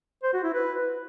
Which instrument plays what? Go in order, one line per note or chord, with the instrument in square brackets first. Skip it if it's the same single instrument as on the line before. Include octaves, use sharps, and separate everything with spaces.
[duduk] C5
F#4
E4
B4